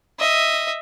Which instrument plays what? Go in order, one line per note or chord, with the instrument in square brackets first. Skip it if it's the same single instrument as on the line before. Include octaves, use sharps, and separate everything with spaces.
[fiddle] D#5 E5